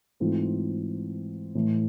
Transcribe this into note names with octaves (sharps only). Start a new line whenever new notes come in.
G#2 E3 A3 C4 F4
A2 E3 A3